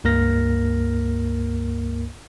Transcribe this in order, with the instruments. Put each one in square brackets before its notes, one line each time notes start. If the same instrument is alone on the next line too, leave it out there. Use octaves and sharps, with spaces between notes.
[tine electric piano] C#2 G2 A#3 A#4 F6 A#6